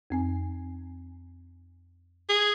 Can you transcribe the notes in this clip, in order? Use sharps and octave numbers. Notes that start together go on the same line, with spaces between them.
F2 C4 G#5
G#4